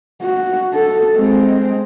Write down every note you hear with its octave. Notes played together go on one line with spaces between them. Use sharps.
F#4
A4
G#3 C4